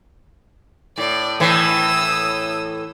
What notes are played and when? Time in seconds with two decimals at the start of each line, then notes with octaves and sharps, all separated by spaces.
0.98 A2 D5
1.40 A2 E3 D#6 E6